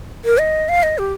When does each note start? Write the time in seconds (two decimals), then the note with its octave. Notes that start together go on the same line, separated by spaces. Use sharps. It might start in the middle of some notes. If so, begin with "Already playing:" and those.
0.25 A#4
0.39 D#5
0.69 F5
0.83 D#5
0.98 G4